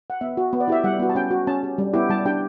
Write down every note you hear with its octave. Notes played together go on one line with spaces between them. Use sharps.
F#5
B3 E5
F#4
B3
D5
E4 G4 E5
G3 F#5
B3 F#4
A5
C#4 G5
F#4
C#4 A5
G4
G3
B3 E4 G4
G3 A5
D4 G4 G5